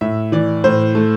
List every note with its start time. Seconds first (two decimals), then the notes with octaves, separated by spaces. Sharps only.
0.01 A2 E5
0.32 E3 D5
0.64 A2 C5
0.95 A3